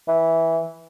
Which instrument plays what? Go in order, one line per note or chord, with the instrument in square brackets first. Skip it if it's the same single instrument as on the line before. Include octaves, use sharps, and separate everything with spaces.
[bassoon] E3